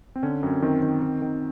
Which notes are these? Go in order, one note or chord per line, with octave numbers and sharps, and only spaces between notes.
C4
D3 C#4
F#2 C4
D#3 C4
D#3
D#3
D#3